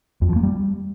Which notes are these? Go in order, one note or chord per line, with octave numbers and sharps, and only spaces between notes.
F2
F3
A#3
G3